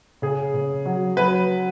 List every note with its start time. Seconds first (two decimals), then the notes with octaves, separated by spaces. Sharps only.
0.22 C#3 G#4
0.54 C#3
0.86 F#3
1.17 F#3 B4